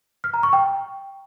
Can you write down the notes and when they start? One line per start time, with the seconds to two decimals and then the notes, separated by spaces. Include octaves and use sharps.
0.24 F6
0.34 A#5
0.43 C#6
0.53 G5